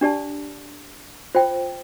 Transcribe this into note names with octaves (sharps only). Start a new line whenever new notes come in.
D4 G4 D5 A5
F4 C5 G5